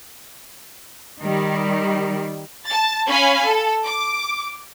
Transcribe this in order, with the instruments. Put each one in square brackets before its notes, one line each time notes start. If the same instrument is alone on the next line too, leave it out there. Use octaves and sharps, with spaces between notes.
[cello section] D#3 G3
[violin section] A5 A6
C#4 F5 G#5 B5
A4
D6